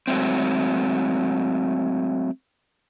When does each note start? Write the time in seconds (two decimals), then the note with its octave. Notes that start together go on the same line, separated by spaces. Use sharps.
0.07 F#3 G#3 A3 C4